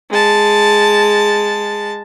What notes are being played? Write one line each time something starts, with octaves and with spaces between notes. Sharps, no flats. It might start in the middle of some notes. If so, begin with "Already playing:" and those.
G#3 A5